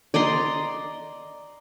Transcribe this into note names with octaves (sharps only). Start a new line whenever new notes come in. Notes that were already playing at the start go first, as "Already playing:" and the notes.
D5 D#5 A#5 C6